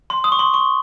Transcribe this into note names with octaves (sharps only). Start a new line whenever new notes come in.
C6
D#6
C#6
C6
C#6